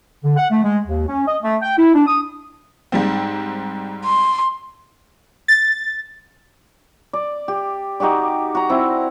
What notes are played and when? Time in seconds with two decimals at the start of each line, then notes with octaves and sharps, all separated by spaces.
0.24 D3
0.37 F#5
0.51 A3
0.63 G#3
0.87 D#2
1.08 C#4
1.27 D#5
1.42 A3
1.62 G5
1.77 E4
1.94 D4
2.07 D#6
2.92 G#2 G3 C4
4.05 C6
5.48 A6
7.13 D5
7.48 G4
8.00 D#4 F#4 G4 D5
8.55 F#4 A#5
8.69 C4 E4